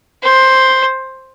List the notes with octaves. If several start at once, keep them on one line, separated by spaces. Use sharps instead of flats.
C5